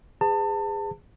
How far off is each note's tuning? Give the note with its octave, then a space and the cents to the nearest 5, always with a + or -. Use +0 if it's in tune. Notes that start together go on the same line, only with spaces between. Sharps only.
G#4 -25 B4 +35 A5 +30